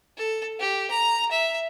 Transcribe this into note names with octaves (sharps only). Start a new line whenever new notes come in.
A4
G4
A#5
E5